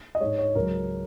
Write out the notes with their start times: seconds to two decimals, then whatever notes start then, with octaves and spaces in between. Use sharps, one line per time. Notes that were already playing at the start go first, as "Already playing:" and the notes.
0.15 D#5
0.21 G#2 G#3 C#5
0.39 C#5
0.55 C#2 C#3 F#3 A#4